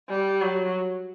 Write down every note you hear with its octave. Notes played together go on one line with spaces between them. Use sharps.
G3
F#3